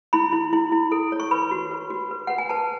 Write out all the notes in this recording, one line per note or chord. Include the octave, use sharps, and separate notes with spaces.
E4 B5
E4
E4
E4
A4
C#5
C#6
B4 B5
F#4
B4
F#4
B4
B4 F#5
G#5
B4 A5